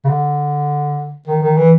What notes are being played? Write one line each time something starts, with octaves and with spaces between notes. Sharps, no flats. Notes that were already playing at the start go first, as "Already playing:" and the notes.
C#3
D3
D#3
D#3
E3